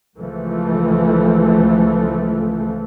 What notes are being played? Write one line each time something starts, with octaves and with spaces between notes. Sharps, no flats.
C#2 E3 F3 A3